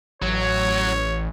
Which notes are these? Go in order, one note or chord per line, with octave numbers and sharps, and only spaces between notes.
A1 F#3 C#5